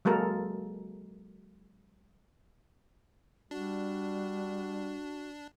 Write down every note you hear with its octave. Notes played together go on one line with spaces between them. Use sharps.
F#3 G#3 A#3 A4 A#4
G3 D4 F#4